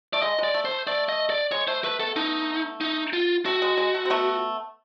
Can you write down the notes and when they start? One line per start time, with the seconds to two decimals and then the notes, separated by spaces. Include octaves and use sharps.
0.13 A3 D5
0.22 G#3 D#5
0.38 G#3 D5
0.54 A3
0.65 C5
0.71 A3
0.87 A3 D5
1.09 D#5
1.30 D5
1.51 G#3 C#5
1.68 A3 C5
1.84 A3 B4
2.00 A3 B3 A4
2.16 A3 B3 D#4
2.81 D#4
3.13 F4
3.45 A3 F#4
3.62 G#3
3.77 G#3
3.95 A3
4.05 C4
4.10 A3 B3